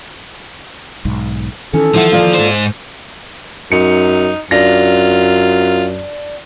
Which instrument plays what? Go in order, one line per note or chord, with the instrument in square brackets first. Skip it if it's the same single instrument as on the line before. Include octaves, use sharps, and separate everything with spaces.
[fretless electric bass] B1 G#2
[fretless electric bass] D#3 E3 [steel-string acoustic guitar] C#4 [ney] A4
[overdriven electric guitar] F3 [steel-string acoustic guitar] D4 E4 F#5
[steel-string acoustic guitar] A#3 F4 D5
[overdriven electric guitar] G#2 C5
[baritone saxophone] F#2 [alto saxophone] D#4 [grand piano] C#7
[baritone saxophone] F#2 [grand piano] D4 A#6 [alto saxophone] F4